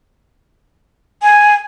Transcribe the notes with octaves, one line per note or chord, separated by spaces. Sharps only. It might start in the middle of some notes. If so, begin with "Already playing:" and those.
G#5